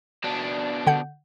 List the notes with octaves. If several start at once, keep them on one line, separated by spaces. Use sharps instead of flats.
B2 D4
D3 F#5 G6